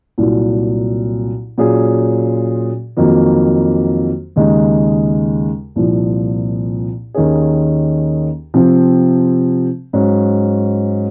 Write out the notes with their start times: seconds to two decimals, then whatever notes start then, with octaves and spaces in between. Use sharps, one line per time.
0.18 C2 A#2 F#3
1.58 A#2 F#3 C#4 F4 G#4
2.97 F2 D#3 F#3 A#3
4.36 D#2 C#3 G#3 D#4
5.76 C2 A#2 F3
7.14 D#2 D#3 A#3 C#4 G#4
8.54 C3 F3 C4
9.93 G#2 F#3 C#4